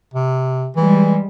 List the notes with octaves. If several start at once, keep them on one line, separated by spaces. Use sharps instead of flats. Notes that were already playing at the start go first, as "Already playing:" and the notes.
C3
E3 G3 G#3